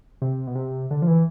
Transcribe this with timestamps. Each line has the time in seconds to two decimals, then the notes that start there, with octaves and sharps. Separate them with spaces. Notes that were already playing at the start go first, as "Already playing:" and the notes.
0.22 C3
0.47 B2
0.55 C3
0.91 D3
1.02 F3
1.07 E3